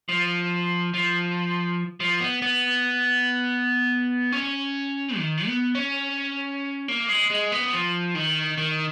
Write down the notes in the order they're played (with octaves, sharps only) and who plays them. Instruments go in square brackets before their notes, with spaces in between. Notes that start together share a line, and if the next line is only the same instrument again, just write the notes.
[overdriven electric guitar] F3
F3
F3
B3
B3
C#4
D#3
B3
C#4
A#3
G#3
G#3
B3
F3
D#3
D#3